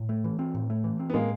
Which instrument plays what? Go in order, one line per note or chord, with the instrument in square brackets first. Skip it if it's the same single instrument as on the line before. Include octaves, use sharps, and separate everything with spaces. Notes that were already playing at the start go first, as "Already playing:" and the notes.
Already playing: [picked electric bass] A2
A3
E3
C4
A2
A3
E3
C4
[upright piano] B3
[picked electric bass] A2 [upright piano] G#3 A#3